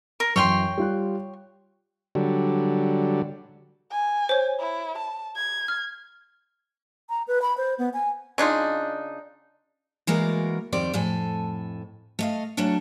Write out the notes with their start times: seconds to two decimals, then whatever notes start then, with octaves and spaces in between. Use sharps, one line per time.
0.20 A#4
0.36 F#2 E3 C#5 G5 C6
0.77 G3 F4 F#6
2.15 D3 F#3 G3
3.92 G#5
4.29 C5 C#5
4.60 E4
4.98 A5
5.36 G#6
5.68 F6
7.09 A#5
7.27 B4
7.42 B5
7.57 C5
7.78 B3
7.93 G#5
8.38 C#3 D4 D#4 F4
10.07 E3 G#3 A#3 F#4 A#4 D5
10.72 F2 D#3 G3 C4 D5
10.93 F2 A2 A4 G#5
12.19 A3 D#5 F5
12.57 F#3 A3 C#4 D4 F#4